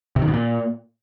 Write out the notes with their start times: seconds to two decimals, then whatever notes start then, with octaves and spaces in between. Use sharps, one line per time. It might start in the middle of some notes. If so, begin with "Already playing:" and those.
0.16 C3
0.22 D#3
0.28 B2
0.34 A#2